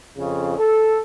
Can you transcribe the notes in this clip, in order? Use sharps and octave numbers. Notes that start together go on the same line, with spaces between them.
F2 C#3
A4